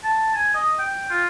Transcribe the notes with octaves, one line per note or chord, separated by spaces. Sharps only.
A5
G#5
D#5
G5
F4